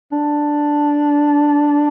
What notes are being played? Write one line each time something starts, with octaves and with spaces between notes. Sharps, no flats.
D4